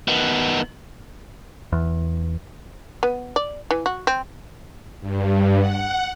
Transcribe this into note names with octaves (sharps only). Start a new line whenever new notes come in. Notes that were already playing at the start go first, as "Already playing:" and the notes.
D#3 B3
E2
B3
D5
E3
F#4
C4
G2
F#5